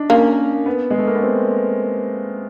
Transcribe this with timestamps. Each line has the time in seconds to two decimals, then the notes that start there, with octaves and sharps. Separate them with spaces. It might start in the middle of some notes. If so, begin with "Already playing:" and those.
Already playing: D4 D#4
0.10 A#3 C#4
0.66 B3
0.91 G#3
0.98 A3
1.07 A#3
1.15 B3
1.23 C4